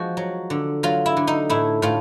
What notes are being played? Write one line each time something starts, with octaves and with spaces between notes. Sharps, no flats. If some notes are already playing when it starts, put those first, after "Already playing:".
Already playing: F3 G#3 F#4
F#3
D3
F#3 F4
E4
D3
D#4
A2 E4
A2 F4